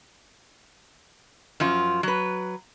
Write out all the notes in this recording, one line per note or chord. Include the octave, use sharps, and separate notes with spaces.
F#2 F3 F4
F#3 B4